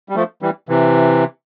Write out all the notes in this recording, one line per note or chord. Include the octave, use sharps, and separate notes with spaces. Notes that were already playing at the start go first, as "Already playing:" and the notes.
G3
F3 A3
E3 G3
C3 E3